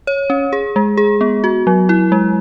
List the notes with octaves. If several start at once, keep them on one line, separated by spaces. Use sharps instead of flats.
C#5
C#4
G#4
G#3
G#4
B3
F#4
F#3
E4
G#3